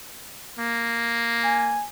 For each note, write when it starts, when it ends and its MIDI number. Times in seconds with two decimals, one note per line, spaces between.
0.59 1.84 58
1.44 1.87 80